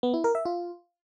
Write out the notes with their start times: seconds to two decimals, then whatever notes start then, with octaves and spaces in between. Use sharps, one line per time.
0.03 B3
0.14 E4
0.24 A#4
0.35 E5
0.45 F4